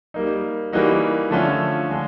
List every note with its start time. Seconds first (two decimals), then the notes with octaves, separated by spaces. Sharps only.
0.14 G3 A#3 D#4
0.73 E3 G3 A#3 D#4 F#4
1.31 D3 F3 A3 C#4 F4
1.89 D3 F3 G#3 C#4